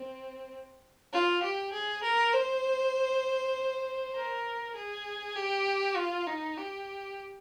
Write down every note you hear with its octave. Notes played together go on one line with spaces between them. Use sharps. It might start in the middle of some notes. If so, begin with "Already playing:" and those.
Already playing: C4
F4
G4
G#4
A#4
C5
A#4
G#4
G4
F4
D#4
G4